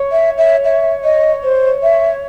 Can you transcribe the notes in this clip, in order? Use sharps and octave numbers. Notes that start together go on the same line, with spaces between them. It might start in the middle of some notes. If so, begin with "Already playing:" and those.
Already playing: C#5
E5
E5
E5
D#5
C5
E5